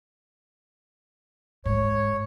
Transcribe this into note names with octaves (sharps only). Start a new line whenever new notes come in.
G#2 C#5